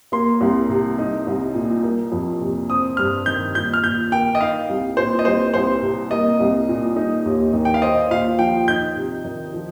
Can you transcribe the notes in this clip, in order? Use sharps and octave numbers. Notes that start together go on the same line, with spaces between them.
A#3 C6
C2
C3
D#4
C2
A#2
A#3
F2
C3
C4 D#6
G2 F6
D#3 G6
A#2 G6
F6
A#2 G6
A#3 G5
D#5
D#4 F5
C2
A#2 C5
D#5
C2 C5
C2 C5
C3
A#3 D#5
C2
A#2
D#4
D#2
D#3
G5
F5
C5 D#5
A#2 F5
F3 G5
D#4 G6
C3
D#3
F3